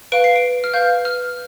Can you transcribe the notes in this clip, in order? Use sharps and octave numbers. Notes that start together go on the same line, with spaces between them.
B4 F5 D7
C7
D7
F6
B4 F5 G6
F6